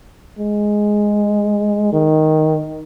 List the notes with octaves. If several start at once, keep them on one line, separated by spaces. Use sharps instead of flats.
G#3
D#3